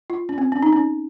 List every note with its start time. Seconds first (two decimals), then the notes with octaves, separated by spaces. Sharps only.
0.10 F4
0.29 C#4
0.38 C4
0.52 C#4
0.62 D#4
0.73 C#4